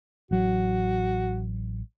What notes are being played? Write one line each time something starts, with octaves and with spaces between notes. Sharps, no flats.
A1 F#3 F#4